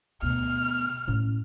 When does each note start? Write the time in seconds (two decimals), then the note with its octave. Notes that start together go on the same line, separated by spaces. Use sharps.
0.22 D2 B2 F6
1.08 A2 C#4